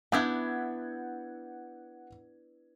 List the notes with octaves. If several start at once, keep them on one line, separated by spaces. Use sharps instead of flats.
B3 D4 E4 F#5 G6 G#6